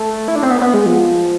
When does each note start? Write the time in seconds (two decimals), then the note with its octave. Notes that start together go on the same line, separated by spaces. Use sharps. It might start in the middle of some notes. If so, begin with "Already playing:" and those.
Already playing: A3
0.28 E4
0.36 D4
0.43 C4
0.50 B3
0.61 B3
0.74 G#3
0.86 F3